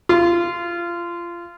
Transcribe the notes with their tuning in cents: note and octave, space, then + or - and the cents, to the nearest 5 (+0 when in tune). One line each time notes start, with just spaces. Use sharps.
F4 -25